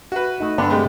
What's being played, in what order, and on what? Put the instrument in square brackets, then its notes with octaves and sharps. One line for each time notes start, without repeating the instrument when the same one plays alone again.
[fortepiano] F#4 B4 [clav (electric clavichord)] E5
[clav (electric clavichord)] A3 D#4
[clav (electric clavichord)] G2 D3 A4 [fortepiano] B3 D4
[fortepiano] C3 G#3 A3